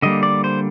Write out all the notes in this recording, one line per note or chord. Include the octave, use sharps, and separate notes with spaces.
D3 G3 A#3 D#5
D5
C5